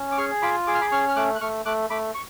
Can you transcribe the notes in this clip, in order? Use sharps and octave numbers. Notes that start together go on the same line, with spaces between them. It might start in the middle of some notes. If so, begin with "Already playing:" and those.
Already playing: C#4
D6
G#4 C#6 F6
F4 B5 D6
G#4 D6
F6
B5 D6
C#4 C#6 F6
F6
A3 D6 F#6
F#6
A3 C#6 F6
A3 D6 F#6
A3 B5 D6
C#6